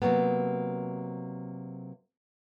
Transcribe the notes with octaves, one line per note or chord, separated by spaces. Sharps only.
C3 F3 F#3 A#3 B3